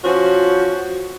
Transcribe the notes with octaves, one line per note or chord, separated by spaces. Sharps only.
F3 C#4 F#4